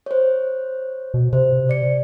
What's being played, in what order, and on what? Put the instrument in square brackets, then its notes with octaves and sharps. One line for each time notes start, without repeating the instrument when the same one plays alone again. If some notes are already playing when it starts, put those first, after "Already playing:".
[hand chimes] C5 C#5
[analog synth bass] B2
[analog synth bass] C3 [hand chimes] C5
[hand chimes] D5 C#7